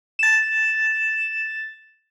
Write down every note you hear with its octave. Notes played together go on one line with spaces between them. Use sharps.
A6 E7